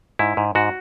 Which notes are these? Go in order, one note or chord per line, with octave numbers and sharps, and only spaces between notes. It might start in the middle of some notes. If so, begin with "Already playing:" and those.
G#2 E4
G#2
G#2 F#4